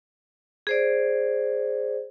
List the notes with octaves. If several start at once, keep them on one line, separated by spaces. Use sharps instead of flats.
G#4 C5 D5